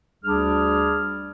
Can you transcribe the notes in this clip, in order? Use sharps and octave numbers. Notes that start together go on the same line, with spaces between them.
D2 G3 D4 G#4 F6